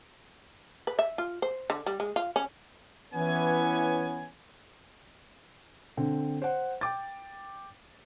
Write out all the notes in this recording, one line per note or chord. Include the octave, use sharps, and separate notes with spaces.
B4
E5
F4
C5
D3
G3
G#3
F4
C#4
E3 B3 C#4 G#5
D3 C4
C5 F#5
G5 D6 A6